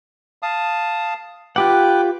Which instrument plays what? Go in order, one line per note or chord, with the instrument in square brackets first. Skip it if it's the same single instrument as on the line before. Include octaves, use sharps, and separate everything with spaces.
[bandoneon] F5 A5 D#6
[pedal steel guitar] F4 G4 F#5 [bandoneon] B4 G5 D6